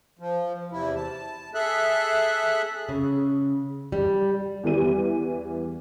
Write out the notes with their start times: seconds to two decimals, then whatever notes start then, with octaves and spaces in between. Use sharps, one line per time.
0.19 F3
0.72 E2 C3 E4
0.95 A5
1.54 G#4 A4 E5 F#6
2.89 C#3
3.92 G3
4.63 E2 E3 G3 D#7